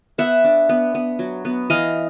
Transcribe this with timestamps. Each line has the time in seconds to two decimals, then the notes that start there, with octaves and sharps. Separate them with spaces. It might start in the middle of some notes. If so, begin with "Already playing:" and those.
0.18 B3 E5 F#5
0.44 D4
0.69 B3
0.95 B3
1.19 F#3
1.45 B3
1.70 E3 D#5 F5